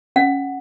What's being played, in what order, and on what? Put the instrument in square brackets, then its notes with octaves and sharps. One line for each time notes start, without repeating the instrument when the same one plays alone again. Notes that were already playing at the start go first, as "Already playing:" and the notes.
[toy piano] C#4 F#5